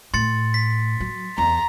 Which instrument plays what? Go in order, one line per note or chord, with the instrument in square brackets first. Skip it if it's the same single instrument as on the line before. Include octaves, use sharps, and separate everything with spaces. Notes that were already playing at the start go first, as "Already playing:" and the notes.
[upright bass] A2 [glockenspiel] C6 A6 C#7
[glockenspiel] B6
[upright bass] F#3
[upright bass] E2 [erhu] A#5